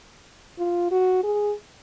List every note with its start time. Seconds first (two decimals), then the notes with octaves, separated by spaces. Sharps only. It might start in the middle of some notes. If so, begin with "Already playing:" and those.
0.59 F4
0.91 F#4
1.24 G#4